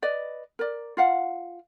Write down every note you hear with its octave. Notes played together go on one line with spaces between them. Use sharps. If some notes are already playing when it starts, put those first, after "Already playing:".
B4 D5 D#5
A#4 D5
F4 F5 F#5